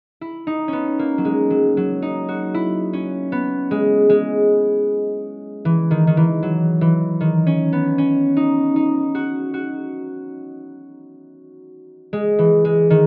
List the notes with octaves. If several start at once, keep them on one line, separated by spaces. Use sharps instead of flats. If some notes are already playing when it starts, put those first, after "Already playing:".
E4
D#4
B3 C#4
A#3
F#3
G#3
F#3
F#3
D#4
F#4
E4
C#4
B3
G#3
G#3
E3
D#3
D#3
E3
F#3
E3
D#3
C#4
B3
C#4
D#4
D#4
F#4
F#4
G#3
E3
G#3
D#3